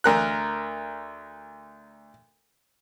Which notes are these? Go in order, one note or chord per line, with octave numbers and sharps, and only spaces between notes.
D2 A#4 F#6